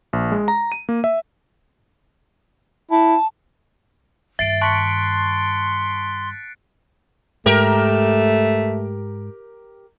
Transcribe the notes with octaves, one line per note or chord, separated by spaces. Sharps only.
A#1
G#3
A#5
D#7
A#3
E5
E4 A5
G2 D#3 E5 A6 C7 D7
A5 C6 C#6 F#6 B6 C#7
G#2 A3 G4 A#4